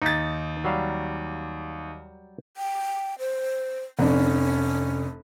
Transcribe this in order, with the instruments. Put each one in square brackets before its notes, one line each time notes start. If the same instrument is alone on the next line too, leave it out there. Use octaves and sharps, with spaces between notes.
[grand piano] D#2 A6 [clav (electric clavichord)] D#4
[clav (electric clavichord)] F#3 G3 F5
[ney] G5
C5
[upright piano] F1 F2 D4 [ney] C#4